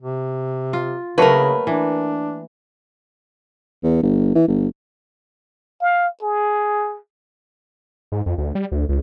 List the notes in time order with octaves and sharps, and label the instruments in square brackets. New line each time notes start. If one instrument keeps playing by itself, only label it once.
[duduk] C3
[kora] F4
[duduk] C#3 [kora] F#3 A3 A#3 [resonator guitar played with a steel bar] A#4 B4
[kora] E3 [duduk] D4
[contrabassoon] E2
G1
E3
G1
[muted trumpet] F5
G#4
[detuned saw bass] G#2
F2
D2
G3
D2
C#2